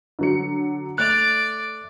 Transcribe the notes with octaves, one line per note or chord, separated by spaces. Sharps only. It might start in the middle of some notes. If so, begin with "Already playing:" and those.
D3 F#3 C#7
A3 D5 F#6 F7